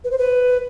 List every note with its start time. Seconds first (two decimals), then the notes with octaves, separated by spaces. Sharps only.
0.04 B4
0.11 C5
0.18 B4